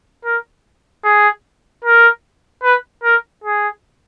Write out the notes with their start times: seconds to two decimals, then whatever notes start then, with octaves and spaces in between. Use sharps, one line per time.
0.24 A#4
1.04 G#4
1.84 A#4
2.63 B4
3.03 A#4
3.44 G#4